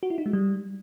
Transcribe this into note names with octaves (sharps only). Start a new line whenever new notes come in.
F#4
E4
D#4
G#3
G3